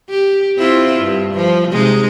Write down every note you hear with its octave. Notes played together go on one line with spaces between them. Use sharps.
G4
C4 E4 F4
G2
F3
C3 G#3 D#4